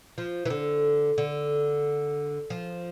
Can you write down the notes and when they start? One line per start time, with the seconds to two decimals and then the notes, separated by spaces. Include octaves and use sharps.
0.18 F3
0.46 E3
0.50 D3
1.18 D3
2.50 F3